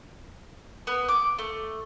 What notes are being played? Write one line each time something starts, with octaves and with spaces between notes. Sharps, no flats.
B3
D6
A3